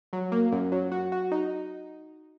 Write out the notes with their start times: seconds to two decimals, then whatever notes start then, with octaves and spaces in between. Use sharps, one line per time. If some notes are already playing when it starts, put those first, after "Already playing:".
0.13 F#3
0.32 A#3
0.52 F#2
0.72 F#3
0.92 F#4
1.12 F#4
1.32 D#4